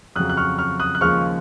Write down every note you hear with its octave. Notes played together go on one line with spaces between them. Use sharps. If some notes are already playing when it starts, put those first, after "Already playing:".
F2 C#3 F#3 D#6 F#6
F#6
C#6 F6
C#6 F6
D#6 F#6
F#6
D#2 C#3 F3 G#3 C#6 F6